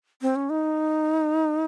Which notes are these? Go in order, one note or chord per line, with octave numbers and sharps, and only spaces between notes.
C4
C#4
D#4